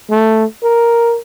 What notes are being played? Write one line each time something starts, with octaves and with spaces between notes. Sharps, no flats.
A3
A#4